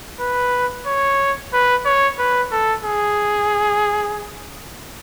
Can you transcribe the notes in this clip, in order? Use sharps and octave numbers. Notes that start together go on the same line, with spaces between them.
B4
C#5
B4
C#5
B4
A4
G#4